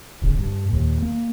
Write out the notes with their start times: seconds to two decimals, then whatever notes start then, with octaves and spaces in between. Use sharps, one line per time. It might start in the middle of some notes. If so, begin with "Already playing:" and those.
0.22 D1 G1 C#3
0.39 G2
0.69 D#2 A#2
1.02 A#3